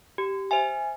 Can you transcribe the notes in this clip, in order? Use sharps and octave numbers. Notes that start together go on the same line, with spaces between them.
G4
C5 E5 G#5